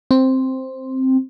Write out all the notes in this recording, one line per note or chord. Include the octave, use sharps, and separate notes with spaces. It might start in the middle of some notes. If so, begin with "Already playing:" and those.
C4